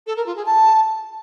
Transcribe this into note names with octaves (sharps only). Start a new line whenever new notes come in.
A4
A#4
F4
G#4
A5